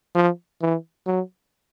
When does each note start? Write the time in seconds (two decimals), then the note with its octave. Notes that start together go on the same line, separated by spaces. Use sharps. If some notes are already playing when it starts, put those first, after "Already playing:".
0.15 F3
0.61 E3
1.07 F#3